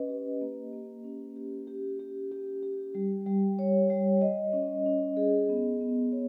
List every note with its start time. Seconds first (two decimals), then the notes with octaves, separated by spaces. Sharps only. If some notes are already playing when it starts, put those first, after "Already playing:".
Already playing: C#4 B4 D#5
0.09 G4
0.41 A#3
0.73 A#3
1.04 C#4
1.36 G4
1.67 G4
1.99 G4
2.32 G4
2.63 G4
2.95 G3
3.26 G3
3.59 C#5
3.90 G3
4.21 D#5
4.53 C#4
4.86 C#4
5.17 G#4
5.49 B3
5.81 B3
6.12 C#5